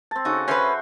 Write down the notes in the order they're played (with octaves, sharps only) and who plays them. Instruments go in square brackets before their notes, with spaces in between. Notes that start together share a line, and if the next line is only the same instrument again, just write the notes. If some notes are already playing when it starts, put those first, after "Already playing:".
[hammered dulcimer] C4 A5
[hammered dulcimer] C#3 F#4 A4 [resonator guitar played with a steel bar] D#4
[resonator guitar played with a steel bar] C#4 B4 [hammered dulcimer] C5 E5 F#5